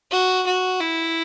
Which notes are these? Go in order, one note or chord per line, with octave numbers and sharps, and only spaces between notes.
F#4
F#4
E4